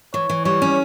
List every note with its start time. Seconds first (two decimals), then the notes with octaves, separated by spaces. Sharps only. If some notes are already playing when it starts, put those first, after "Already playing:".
0.14 E3 C#5
0.29 E3
0.45 G3 C#5
0.62 C#4